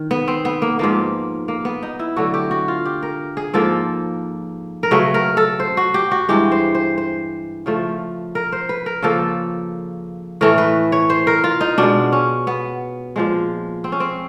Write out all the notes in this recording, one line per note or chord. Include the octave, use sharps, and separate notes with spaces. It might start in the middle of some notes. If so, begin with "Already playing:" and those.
Already playing: D#3
B3
C4
B3
A#3
G#2 F3 A#3 B3
A#3
B3
D#4
E4
D3 F#3 A3 F#4
G4
F#4
F4
G4
A#4
G#4
G#2 F3 A#3 A4
A#4
C#3 F#3 A3 B4
A#4
A4
C5
F#4
G4
F#4
G2 E3 G#3 G4
C5
C5
C5
C#3 F3 A3
A#4
C5
B4
A#4
C#3 F3 A#3 A4
A2 E3 A3 A#4
B4
C#5
C5
A#4
F4
D#4
B2 G#3 D4
C#4
B3
A#2 F3 G#3
C4
C#4
C4